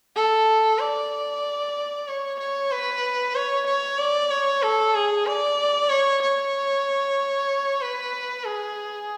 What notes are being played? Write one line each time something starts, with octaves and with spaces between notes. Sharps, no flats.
A4
D5
C#5
C#5
B4
C#5
C#5
D5
C#5
A4
G#4
D5
C#5
C#5
B4
G#4